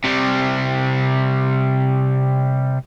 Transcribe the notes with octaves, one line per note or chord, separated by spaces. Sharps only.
C3 G3